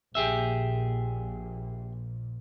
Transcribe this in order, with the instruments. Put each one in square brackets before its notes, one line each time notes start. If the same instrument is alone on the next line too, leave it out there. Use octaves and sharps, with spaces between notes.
[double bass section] A#1 A#2 [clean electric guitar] G4 G#4 E5